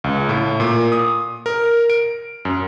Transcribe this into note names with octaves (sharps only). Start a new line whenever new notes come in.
C#2
A2
A#2
D#6
A#4
D7
F#2